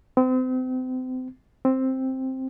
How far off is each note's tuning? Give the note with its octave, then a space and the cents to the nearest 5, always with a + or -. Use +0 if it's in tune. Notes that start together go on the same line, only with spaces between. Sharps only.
C4 -35
C4 +5